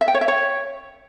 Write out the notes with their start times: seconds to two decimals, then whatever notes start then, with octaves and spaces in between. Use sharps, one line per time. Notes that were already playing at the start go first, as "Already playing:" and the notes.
0.01 E5
0.08 G5
0.14 C#5
0.21 E5
0.28 C#5